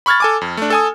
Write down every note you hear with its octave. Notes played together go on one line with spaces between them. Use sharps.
B5 C#6 F6 G#6 A6
A4 G#5 D6
F2
A3 D4
A4 G#5 D#6